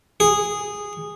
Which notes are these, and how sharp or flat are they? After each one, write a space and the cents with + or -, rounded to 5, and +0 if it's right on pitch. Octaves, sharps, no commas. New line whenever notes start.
G#4 -10